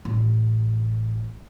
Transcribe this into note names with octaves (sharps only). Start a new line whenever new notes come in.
A1